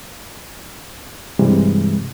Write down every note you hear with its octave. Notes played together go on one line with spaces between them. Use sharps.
G2 C3 E3 G3 G#3